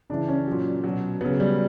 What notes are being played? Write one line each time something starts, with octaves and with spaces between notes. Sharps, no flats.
C#3 E3 D4
C#4
A#2 F#3
B2 F#3
C#3 F#3 B3
G3